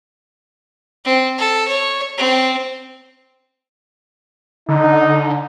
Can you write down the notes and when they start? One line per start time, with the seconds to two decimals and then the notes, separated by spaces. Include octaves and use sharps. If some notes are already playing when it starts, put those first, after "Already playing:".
1.05 C4
1.39 A4
1.68 C#5
2.18 C4
4.69 D3 D#4